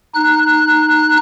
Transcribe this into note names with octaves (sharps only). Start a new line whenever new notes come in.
D#4 F#6